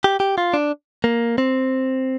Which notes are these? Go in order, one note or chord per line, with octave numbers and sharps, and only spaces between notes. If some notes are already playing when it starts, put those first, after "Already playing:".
G4
G4
F4
D4
A#3
C4